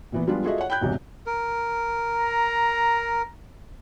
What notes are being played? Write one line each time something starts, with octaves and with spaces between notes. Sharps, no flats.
A#2 E3 B3
F3 G3 G#3 B3 D4 F4
F4 F#4 G#4 A4 D#5 E5
C#5 F#5
G5 B5 F#6 G6
E1 B1 G#2 C3
A#4
A#5